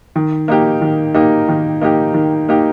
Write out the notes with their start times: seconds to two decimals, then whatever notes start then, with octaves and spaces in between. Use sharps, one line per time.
0.16 D#3
0.48 A#3 D#4 G4
0.82 D#3
1.14 A#3 D#4 G4
1.49 D#3
1.81 A#3 D#4 G4
2.14 D#3
2.48 A#3 D#4 G4